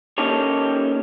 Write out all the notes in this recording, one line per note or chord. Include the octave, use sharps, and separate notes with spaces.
A#3 C#4 D#4 G4 A4 C#5